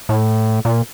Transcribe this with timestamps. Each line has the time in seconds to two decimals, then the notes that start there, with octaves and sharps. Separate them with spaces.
0.09 A2
0.65 A#2